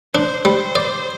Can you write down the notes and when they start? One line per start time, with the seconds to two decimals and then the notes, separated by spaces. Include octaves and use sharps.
0.15 D4 C5
0.45 G3 C5
0.75 D5